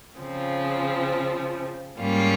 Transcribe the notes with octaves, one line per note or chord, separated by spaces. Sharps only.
C#3 F3 C4
G#2 G3 A#3 C#4 F4